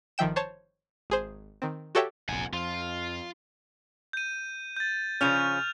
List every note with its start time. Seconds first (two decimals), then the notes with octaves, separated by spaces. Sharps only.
0.18 G1 D#3 F3 E5 G5 E7
0.36 C5 C#5 A5
1.10 G#1 G#4 C5
1.62 D#3 C4
1.95 F#4 G4 A4 C#5 E5 G5
2.29 F1 A#1 F#5 G#5
2.53 F2 F4
4.13 G6 D#7
4.76 G6 A6
5.21 C#3 F3 C#4 F6 G6 F7